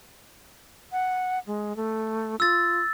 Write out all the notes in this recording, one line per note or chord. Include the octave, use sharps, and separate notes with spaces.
F#5
G#3
A3
F4 E6 A6